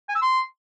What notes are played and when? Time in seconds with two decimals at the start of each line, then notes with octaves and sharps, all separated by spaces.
0.09 G#5
0.15 E6
0.22 C6